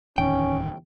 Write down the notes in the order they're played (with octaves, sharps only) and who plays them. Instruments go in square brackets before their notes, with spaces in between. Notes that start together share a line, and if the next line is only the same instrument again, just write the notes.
[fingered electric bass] D1 E2 D#3 [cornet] C#4 [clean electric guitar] G5